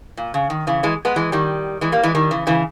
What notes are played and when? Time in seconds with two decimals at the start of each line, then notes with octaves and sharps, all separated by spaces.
0.17 A#2
0.34 C#3
0.50 D#3
0.67 C#3 E3
0.83 E3 G#3
1.05 G#3 B3
1.16 E3 G#3
1.32 D#3 G3
1.81 E3 G#3
1.92 G3 A#3
2.03 E3 G#3
2.15 D#3 G3
2.31 C#3 E3
2.47 C#3 E3